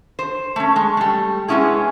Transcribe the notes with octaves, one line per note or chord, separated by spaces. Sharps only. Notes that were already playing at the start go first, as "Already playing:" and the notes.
C5
A3 C#4
G#3
G3 A3
G#3 B3 C#4 E4 G#4